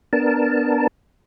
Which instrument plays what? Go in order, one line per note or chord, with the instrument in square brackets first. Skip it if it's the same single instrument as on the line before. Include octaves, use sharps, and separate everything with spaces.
[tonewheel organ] B3 D4 A#4 A5